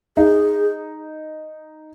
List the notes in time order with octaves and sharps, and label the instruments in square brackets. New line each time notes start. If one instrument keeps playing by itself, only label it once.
[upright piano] D#4 [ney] G#4